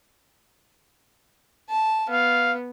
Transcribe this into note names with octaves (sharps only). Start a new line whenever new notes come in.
A5
B3 F5